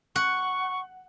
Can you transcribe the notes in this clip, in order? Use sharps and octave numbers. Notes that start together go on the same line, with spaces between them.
F#5 C#6